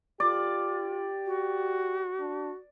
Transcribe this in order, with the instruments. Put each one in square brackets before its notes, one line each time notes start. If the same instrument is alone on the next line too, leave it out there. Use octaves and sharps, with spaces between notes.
[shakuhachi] F4 [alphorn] G4 [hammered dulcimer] D5
[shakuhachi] F#4
[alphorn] D4